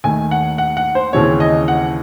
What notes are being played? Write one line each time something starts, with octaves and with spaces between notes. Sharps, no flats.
D#2 D#3 A3 G#5
F#5
F#5
F#5
C5
D#2 C#3 E3 C4 C#5
D#5
F#5